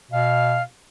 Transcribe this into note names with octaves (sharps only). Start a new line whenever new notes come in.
B2 F5